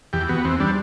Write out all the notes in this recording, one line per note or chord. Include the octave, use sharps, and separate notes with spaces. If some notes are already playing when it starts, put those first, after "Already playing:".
E2 G4
B3 F#4
E2 C4
G3 D4